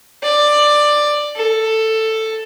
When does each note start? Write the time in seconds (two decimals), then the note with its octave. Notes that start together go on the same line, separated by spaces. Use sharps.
0.23 D5
1.36 A4